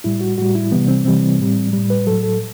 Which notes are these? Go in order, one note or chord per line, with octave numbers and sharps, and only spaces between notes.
A2 G3 E4
F#4
A2 G3 F#4
E4
C3 E3 G3 B3
C4
C3 E3 G3 C4
A2 G3
A2 G3
B4
A2 F#3 A4
A4